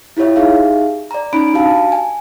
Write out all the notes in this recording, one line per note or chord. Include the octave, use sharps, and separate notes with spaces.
E4 F4 G4 C#5 E5
D#4 G4 G#4 E5 F5
D5 A#5
C#4 D#4 B5 D7
D4 F#4 G4 F5 A5
G#5